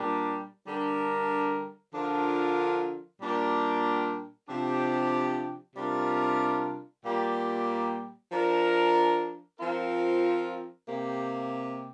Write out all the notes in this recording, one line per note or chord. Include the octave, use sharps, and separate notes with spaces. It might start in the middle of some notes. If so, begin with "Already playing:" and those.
Already playing: A#2 G3 D4 G4 A#4
D3 G3 D4 A#4
D3 F3 D4 F4 A#4
A#2 G3 D4 G4 A#4
C3 F3 D4 G4
C3 G3 D4 F4 A#4
A#2 G3 A#3 G4
F3 D4 A#4
F3 C4 F4 A#4
C3 A#3 G4